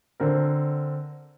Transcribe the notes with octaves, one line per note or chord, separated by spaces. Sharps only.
D3 C4 A#4